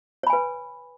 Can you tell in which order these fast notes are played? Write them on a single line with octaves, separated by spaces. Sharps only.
C#5 B5 G#5 B4